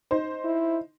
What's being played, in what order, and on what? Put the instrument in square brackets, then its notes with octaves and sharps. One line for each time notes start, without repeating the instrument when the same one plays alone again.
[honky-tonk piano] D#4 C5
[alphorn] E4